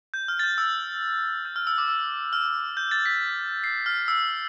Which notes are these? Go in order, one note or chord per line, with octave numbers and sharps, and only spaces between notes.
G6
F6
A6
G6
E6
G6
F6
E6
D6
E6
F6
G6
A6
B6
C7
F6
E6